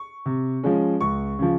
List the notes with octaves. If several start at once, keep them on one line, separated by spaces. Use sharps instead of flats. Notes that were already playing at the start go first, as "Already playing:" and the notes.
Already playing: C#6
C3
F3 G#3 C#4
C#2 C#6
C#3 F3